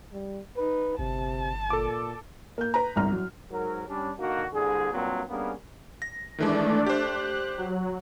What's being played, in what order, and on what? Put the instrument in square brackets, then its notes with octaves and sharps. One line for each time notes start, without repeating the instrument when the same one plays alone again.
[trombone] G3
[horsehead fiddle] D#4 [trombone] B4
[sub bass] G1 [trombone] C3 [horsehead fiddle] A5
[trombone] A#2 [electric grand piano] A4 D6
[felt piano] A#3 G6
B4 A#5
G1 C2 A#5 F6
F#3
[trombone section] G#2 F#3 A#4
G3 C#4 D4
D3 A#3 D#4 F#4
C2 D3 G3 G#4
G2 A#2 F#3 A#3 C4
G3 A#3 B3 C#4 D4 G#4
[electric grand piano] A#6
[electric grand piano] D#3 E3 G#3 [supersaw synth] A3 D4 D5
[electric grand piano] G4 C5 [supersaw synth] F#6
[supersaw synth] F#3